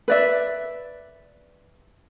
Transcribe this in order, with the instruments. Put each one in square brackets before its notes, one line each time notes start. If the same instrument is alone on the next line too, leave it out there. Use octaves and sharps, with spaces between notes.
[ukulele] B4 D5 E5